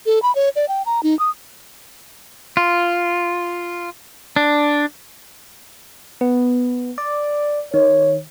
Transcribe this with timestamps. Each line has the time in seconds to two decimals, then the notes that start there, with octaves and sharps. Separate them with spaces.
0.06 A4
0.23 B5
0.35 C#5
0.56 D5
0.69 G5
0.86 A#5
1.03 D#4
1.19 D#6
2.57 F4
4.36 D4
6.21 B3
6.98 D5
7.74 D#3 C#5